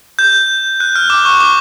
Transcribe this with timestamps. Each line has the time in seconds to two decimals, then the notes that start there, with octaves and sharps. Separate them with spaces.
0.19 G6
0.80 F#6
0.96 F6
1.10 D6
1.25 C#6
1.40 D6